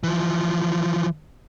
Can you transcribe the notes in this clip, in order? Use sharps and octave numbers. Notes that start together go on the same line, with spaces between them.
E3 F3